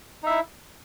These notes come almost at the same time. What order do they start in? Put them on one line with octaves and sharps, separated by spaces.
D#4 E5 E4